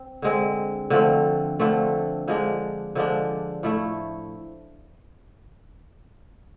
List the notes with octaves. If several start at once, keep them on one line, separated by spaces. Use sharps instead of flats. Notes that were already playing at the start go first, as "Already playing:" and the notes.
Already playing: C4
D3 G#3 C4
D3 F3 A3 C4
D3 F3 A3 C4
D3 F3 G#3 D4
D3 F3 G#3 D4
A2 F3 A3 E4